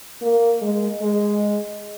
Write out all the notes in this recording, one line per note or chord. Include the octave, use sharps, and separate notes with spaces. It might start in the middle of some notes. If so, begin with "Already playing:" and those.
A#3
G#3
G#3